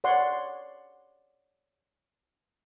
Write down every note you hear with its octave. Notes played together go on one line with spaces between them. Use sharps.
C#5 D5 F#5 C6